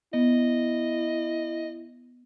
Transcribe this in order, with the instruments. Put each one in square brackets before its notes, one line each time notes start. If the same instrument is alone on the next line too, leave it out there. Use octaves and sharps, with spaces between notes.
[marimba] B3 [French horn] E4 [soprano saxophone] D#5